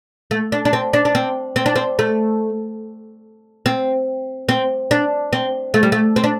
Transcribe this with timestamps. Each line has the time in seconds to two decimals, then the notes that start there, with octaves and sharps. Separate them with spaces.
0.31 A3
0.52 D4
0.65 D4
0.73 C4
0.93 D4
1.05 D4
1.15 C4
1.56 C4
1.66 D4
1.76 C4
1.99 A3
3.66 C4
4.49 C4
4.91 D4
5.33 C4
5.74 A3
5.83 G3
5.92 A3
6.16 C4
6.24 D4